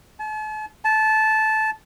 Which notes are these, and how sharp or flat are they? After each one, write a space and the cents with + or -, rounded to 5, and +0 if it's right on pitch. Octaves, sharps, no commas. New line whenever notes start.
A5 -45
A5 -15